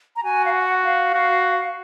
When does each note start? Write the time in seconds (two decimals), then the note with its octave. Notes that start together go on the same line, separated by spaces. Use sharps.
0.16 A#5
0.24 F#4 G#5
0.45 F5
0.54 F#5
0.84 F5
1.14 F#4